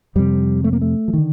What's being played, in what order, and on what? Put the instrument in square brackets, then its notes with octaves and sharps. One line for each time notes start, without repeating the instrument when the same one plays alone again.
[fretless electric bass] F2 C3 G3
A3
A#3
A3
F3
D3 D#3